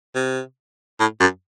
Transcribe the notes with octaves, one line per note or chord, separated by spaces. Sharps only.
C3
A2
F#2